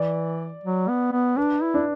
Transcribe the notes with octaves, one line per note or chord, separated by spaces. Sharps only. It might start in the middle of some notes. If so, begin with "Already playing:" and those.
Already playing: E3 D5
F#3
B3
B3
D4 B4
E4
D4